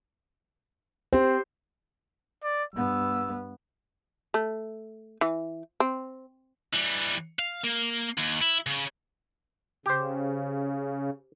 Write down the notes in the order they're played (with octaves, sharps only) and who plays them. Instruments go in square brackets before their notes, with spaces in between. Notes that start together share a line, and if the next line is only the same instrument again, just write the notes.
[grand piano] C4 [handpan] G4 C5
[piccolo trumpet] D5
[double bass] G2 B3 [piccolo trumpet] E6
[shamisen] A3
E3
C4
[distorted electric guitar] E3 G3
F5
A#3
D#2
E4
C#3
[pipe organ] C#3 [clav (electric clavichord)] G4 C5